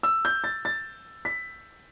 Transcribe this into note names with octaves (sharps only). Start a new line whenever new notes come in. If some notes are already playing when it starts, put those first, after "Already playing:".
E6
G6
A6
A6
B6